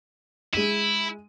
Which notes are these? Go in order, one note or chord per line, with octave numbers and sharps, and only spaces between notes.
G#3 E4 D#7